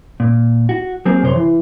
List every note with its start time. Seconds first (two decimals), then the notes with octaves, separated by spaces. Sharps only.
0.20 A#2
0.69 F#4
1.05 F#3 A#3 C4 G#4
1.23 F#2 C3 C5 C#5 C6
1.36 E3